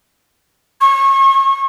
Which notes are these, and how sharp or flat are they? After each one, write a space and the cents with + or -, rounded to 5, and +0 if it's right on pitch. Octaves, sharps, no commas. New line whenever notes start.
C#6 -30